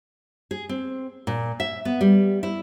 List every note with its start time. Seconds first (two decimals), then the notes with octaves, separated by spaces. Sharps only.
0.51 G#4
0.69 C4
1.27 A#2
1.60 E5
1.85 B3
2.01 G3
2.43 E4